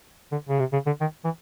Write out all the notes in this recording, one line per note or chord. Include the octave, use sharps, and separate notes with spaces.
D3
C#3
C3
C#3
D3
D#3
E3